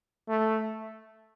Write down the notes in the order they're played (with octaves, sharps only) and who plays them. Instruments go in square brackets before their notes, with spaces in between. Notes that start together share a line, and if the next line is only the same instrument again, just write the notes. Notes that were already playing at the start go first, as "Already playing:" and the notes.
[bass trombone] A3